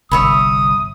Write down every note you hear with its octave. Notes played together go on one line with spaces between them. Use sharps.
G1 C2 C#5 E5 B5 D#6